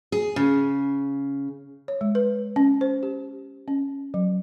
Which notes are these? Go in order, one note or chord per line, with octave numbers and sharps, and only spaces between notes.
G#4
C#3
C#5
G#3
B4
C#4
C5
G4
C#4
F#3